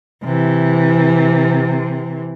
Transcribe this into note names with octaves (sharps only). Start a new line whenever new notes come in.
C3 E3